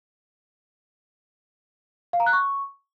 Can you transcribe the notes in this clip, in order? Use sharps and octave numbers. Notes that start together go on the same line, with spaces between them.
F5
A#5
F#6
C#6